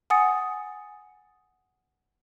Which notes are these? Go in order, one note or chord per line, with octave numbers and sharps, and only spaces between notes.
F#5 G#5 D#6 A6 C#7